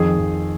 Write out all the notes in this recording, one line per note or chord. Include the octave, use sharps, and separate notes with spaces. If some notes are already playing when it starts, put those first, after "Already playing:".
Already playing: F2 D#3 G#4
F2